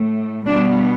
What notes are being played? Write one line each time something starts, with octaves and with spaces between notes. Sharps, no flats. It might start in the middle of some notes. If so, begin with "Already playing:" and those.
Already playing: A2 A3
B2 G3 B3 D4